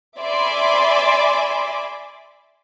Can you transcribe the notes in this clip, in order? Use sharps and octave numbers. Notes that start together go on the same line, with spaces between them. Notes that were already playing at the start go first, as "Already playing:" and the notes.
D5 E5 G#5 B5 C6 D6